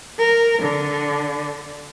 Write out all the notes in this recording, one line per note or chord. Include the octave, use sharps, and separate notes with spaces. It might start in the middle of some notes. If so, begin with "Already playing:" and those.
A#4
D3